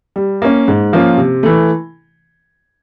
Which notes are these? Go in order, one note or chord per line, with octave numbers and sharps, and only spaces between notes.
G3
A#3 C#4
G#2
F3 A#3 C#4 F4
C3
E3 A3